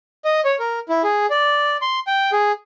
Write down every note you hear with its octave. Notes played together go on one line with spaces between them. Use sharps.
D#5
C#5
A#4
E4
G#4
D5
C6
G5
G#4